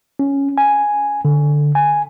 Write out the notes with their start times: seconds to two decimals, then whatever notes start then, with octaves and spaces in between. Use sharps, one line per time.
0.19 C#4
0.58 G#5
1.25 D3
1.75 G#5